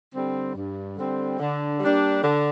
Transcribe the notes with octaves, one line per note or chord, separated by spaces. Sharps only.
D3 G3 C4
G2
D3 G3 C4
D3
G3 A#3 D4 G4
D3